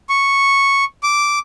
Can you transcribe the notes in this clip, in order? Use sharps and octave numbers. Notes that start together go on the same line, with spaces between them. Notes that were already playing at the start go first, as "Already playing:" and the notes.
C#6
D6